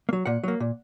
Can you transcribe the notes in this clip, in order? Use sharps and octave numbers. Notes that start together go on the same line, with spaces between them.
A#3
F#3
A#2 F#5
F#3 A#3
A#2